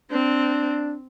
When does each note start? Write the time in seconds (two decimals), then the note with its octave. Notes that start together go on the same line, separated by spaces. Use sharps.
0.11 C4 D4